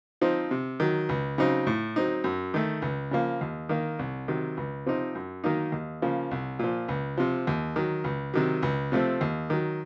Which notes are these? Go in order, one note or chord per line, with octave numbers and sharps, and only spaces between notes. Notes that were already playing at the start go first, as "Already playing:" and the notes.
F3 C4 D#4
C3
D#3 F#3
C#2
C#3 F#3 C4 D#4
A2
F#3 C4 D#4
F#2
D#3 A3
C#2
C#3 F3 A#3
D#2
D#3 A#3
C2
C3 D#3 F#3
C#2
C3 F3 C4 D#4
F#2
D#3 F#3 A#3 D#4
D#2
C#3 F3 A#3
C2
A#2 F3
C#2
C3 F3
D#2
D#3 F#3
C#2
C3 D#3 F#3
C#2
C3 F3 A3 C4
D#2
D#3 F#3